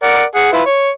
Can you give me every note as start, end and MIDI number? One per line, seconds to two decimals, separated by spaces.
0.03 0.23 70
0.03 0.23 74
0.03 0.23 78
0.35 0.52 68
0.35 0.52 78
0.53 0.62 64
0.53 0.62 65
0.53 0.62 71
0.66 0.89 73